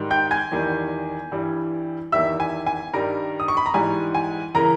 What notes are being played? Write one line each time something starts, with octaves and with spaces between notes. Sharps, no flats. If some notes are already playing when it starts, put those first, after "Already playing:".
Already playing: G#2 D#3 G3
G5 G6
G#5 G#6
E2 D#3 G3
G2 E3 G3
E2 D#3 G3 E5 E6
G#5
G#5
G2 D#3 G3 A#4 A#5
D#6
C#6
B5
A#5
G#2 E3 G3 G#5
G#5
C#3 E3 A#4 A#5